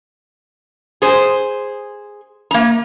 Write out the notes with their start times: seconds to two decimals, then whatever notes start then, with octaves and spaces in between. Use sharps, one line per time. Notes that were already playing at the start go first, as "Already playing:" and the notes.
1.02 G#4 C5
2.51 A#3 A#5